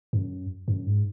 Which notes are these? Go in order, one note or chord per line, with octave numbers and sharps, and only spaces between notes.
F#2
F#2
G#2